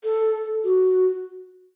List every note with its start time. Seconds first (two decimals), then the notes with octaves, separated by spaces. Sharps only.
0.04 A4
0.64 F#4